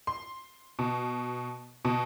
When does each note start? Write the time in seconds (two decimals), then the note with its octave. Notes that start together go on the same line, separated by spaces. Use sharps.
0.07 C6
0.79 B2
1.85 B2